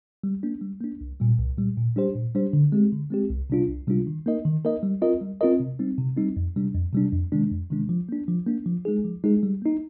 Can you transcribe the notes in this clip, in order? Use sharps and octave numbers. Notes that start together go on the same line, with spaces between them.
G3
A#3 D4
G3
A#3 D4
C2
A#2 G3
C2
A#2 G3
A#2
G3 D4 G4 C5
A#2
G3 D4 G4 C5
D3
G#3 C4 G4
D3
G#3 C4 G4
C2
C3 G3 D4 F4
C2
C3 G3 D4 F4
D#3
A#3 D#4 A#4 D#5
D#3
A#3 D#4 A#4 D#5
G3
C4 F4 A#4 D#5
G3
C4 F4 A#4 D#5
C3
G3 C4 D#4
C3
G3 C4 D#4
F2
C3 G3 D4
F2
C3 G3 D4
F2
C3 D#3 G#3 D4
F2
C3 D#3 G#3 D4
F3
A#3 D4
F3
A#3 D4
F3
G#3 D#4 G#4
F3
G#3 D#4 G#4
G3
A#3 D#4